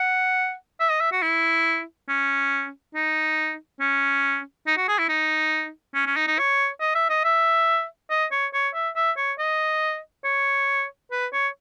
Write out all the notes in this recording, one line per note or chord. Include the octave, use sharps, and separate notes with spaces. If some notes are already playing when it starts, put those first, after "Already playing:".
Already playing: F#5
E5
D#5
E5
F#4
E4
C#4
D#4
C#4
D#4
F#4
G#4
E4
D#4
C#4
C#4
D#4
D#4
C#5
D#5
E5
D#5
E5
D#5
C#5
C#5
E5
E5
C#5
D#5
C#5
B4
C#5